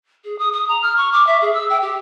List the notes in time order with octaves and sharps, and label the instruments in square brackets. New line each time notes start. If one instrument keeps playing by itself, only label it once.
[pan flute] G#4
D#6
D#6
A#5
F6
C#6
D6
E5
G#4
E6
G5
G4